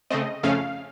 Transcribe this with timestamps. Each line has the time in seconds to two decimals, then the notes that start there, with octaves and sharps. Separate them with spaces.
0.10 C#3 A3 C4 D#5
0.43 F2 C#3 A3 C#4 F5